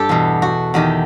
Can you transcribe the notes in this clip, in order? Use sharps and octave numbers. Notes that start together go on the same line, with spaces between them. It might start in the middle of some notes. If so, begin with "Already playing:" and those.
Already playing: G2 G4 A4
E2 B2
F#4
E2 D#3 G4